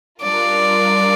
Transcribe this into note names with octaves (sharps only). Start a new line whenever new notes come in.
G3 D4 F4 A#4 D5